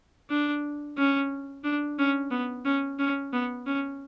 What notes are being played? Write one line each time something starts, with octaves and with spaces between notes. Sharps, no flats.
D4
C#4
D4
C#4
B3
C#4
C#4
B3
C#4